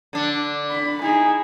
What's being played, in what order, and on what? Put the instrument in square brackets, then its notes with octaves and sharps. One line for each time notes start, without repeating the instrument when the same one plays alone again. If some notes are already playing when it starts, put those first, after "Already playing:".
[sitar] D3 D4
[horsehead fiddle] B5
[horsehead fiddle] D#4 G#4 [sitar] E4